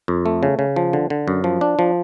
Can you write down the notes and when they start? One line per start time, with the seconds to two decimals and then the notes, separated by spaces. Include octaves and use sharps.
0.08 F2
0.26 A3
0.43 C#3
0.59 C#3
0.76 F3
0.93 D3
1.10 D3
1.28 F#2
1.44 F3
1.61 D4
1.79 F3